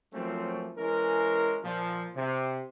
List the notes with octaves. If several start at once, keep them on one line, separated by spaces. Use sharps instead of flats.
F3 F#3 A3 A#3 C4 C#4
E3 G#3 C#4 A#4
A#2 F3
C3